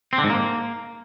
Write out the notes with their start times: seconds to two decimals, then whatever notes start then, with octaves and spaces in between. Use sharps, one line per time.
0.13 C4
0.18 D3
0.24 G#2
0.29 A#3